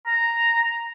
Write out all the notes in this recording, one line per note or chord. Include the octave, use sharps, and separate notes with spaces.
A#5